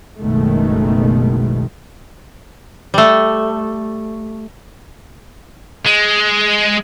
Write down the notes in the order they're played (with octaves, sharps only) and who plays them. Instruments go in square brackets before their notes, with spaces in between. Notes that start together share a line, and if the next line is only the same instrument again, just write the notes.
[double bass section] F#1 B1 B2 D#3 G#3 A3
[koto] G3 A3
[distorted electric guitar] G#3